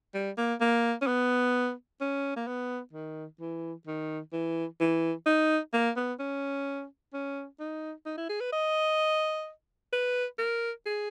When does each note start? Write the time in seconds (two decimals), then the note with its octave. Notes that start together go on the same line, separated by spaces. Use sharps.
0.14 G3
0.38 A#3
0.61 A#3
1.01 C#4
1.07 B3
2.01 C#4
2.36 A#3
2.47 B3
2.93 D#3
3.41 E3
3.87 D#3
4.33 E3
4.80 E3
5.26 D#4
5.74 A#3
5.97 B3
6.20 C#4
7.13 C#4
7.60 D#4
8.06 D#4
8.18 E4
8.29 G#4
8.41 B4
8.53 D#5
9.93 B4
10.39 A#4
10.85 G#4